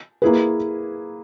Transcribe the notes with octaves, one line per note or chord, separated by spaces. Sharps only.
A#3 E4 G#4 B4